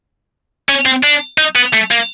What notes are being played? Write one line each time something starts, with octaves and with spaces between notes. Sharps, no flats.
C#4
C4
D4
D#4
B3
A3
A#3